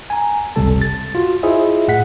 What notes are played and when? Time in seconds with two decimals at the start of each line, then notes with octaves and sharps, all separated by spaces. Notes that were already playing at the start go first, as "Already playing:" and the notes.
0.10 G#5 A#5
0.56 G1 C#2 C3 G3 A4 A5
0.82 A6
1.15 F4 F#4
1.43 E4 F4 G#4 C5 D#5 E5
1.88 A2 F#5 B6